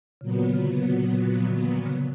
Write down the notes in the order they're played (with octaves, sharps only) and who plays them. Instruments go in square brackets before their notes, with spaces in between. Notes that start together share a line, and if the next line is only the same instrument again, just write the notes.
[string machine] A#2 F#3 B3 [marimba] C#3
[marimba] D#3
D3
C#3
C3
F3
D3 E3
C#3